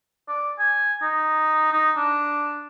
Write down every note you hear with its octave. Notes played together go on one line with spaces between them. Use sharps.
D5
G#5
D#4
D#4
D4